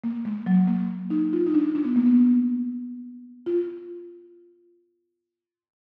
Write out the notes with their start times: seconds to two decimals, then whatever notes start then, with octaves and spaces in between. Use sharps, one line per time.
0.04 A#3
0.25 G#3
0.46 F#3
0.68 A#3
1.10 D#4
1.33 F4
1.47 D#4
1.54 D4
1.75 D4
1.85 B3
1.96 A#3
2.06 B3
3.46 F4